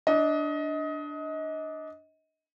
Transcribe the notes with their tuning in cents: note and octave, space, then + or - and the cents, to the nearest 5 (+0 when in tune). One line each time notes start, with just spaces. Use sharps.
D4 +0 D#5 +25